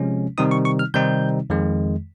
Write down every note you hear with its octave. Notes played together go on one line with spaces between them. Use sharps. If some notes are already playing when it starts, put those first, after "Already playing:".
Already playing: C3 F3 G#3 C#4
C3 D#3 G3 C4 D#4 D#6
C#6
C#6
F6
C3 D#3 G3 C4 D#4 G6
F2 D#3 G#3